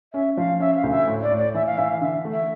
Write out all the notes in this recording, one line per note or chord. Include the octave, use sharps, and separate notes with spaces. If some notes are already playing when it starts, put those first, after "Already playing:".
C#4 E5
F3 F5
C#4 E5
F5
D2
E5
A2
D5
A2
D5
E3 E5
F5
E3 E5
F5
D3 E5
A3
E5